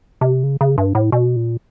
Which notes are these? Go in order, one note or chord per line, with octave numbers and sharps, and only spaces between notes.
C3
C#3
C#3
G2
A2
B2
A#2